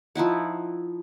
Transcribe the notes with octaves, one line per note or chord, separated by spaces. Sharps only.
F3 D#4 E4 F#5